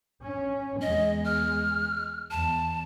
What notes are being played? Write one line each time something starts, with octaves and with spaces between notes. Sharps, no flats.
C#4
E2 G#3 D#5
F6
E2 A5